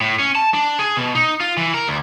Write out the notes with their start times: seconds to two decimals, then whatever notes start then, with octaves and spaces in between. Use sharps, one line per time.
0.01 A2
0.19 C#4
0.35 A5
0.54 D4
0.79 G#4
0.97 B2
1.15 D#4
1.40 F4
1.57 E3
1.74 A#4
1.88 D2